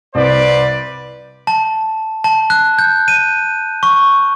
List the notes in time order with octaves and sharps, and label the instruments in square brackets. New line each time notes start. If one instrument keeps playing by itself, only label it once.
[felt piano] C2 [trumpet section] B4 C5 D5
[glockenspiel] A5
A5
F#6
G6
D#7
C#6